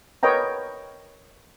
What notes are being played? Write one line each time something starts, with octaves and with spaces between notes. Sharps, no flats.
A#4 B4 C#5 D#5 G5 A#5